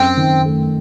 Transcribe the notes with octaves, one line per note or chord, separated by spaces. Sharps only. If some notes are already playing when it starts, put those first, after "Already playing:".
Already playing: F#2 C4
D#3
A3